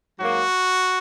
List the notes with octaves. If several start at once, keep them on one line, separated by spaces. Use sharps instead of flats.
G#2 F#3 A#3 F#4